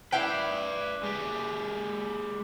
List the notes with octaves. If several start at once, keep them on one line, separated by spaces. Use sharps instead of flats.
E4 B4 D5 F5 G5
G#3 G4